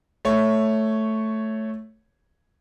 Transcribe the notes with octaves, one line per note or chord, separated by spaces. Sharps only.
A3 C#5